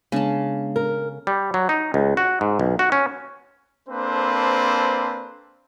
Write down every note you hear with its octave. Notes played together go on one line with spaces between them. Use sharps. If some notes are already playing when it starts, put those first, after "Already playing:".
C#3 G#3 B3 D4 A5
A#4
G3
F#3
D#4
C#2
F#4
G#2
B1
F#4
C#4
A#3 C4 D4 A4 B4 C5